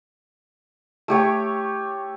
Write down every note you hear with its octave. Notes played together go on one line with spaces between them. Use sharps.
A3 G4 C#5